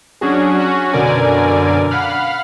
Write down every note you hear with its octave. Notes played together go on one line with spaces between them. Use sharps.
F#3 C#4 D4 F#4 G#4
C#4 F#4
F#2 B2 D3 A#4 D5 G#5
F5 F#5 B5 F6